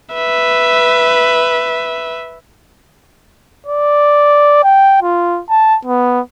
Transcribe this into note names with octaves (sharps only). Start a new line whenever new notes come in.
B4 E5
D5
G5
F4
A5
B3